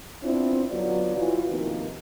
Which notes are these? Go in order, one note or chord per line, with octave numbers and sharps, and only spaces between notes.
B3 C4 D4 E4 F4
D3 F#3 B3 F4 F#4 D5
E3 F4 F#4
C3 D#3 F3 A#3 B3 D#4